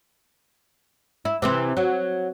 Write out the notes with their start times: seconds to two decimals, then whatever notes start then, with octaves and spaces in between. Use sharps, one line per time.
1.25 E4
1.42 C3 E3 C4
1.77 F#3